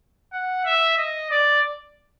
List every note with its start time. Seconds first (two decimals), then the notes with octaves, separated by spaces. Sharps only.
0.32 F#5
0.65 E5
0.97 D#5
1.30 D5